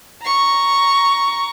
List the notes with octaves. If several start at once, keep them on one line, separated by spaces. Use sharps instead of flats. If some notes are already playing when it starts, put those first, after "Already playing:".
A#5 C#6